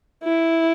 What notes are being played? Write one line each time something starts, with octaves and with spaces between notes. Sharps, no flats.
E4